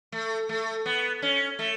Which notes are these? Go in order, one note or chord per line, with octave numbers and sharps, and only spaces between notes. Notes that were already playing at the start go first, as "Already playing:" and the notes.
A3
A3
B3
C#4
A3